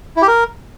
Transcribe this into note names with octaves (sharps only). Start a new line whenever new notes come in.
E4
G4
A#4